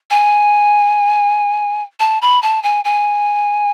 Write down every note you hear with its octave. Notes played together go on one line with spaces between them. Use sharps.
G#5
A5
B5
A5
G#5
G#5